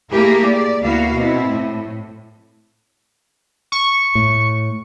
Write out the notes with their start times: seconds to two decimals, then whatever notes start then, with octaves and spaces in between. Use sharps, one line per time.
0.11 A3 A#3 E4 G4 G#4 A#4
0.44 D5
0.80 D2 A#3 B3 E4 F#4 F5
1.15 B2 C4 E4
1.50 A2
3.72 C#6
4.15 A2